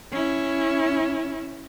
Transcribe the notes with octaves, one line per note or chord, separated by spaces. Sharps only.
C#4 E4